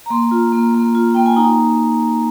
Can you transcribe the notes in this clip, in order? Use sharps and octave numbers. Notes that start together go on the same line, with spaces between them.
A#5
A#3 C6
F4
A#3
A#3
F4
A#3 G5
G#5
D#4 A#5